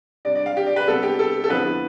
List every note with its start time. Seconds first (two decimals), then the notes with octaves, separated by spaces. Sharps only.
0.25 C3 G3 D4 D5
0.35 D5
0.46 F5
0.57 G4
0.66 D5
0.76 B4
0.87 C3 G3 B3 D4 A4
1.03 G4
1.19 A4
1.44 A4
1.49 F2 D3 F3 B3 E4 B4